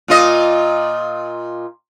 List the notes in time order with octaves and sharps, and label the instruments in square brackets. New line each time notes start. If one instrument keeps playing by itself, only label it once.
[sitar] A#2 F4 D#5